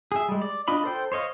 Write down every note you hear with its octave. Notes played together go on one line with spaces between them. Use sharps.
G#4 E5
G3 G#3
D5
D4 F4 D#5 B5
A4 C5 G5
C5 C#5 D#5 F5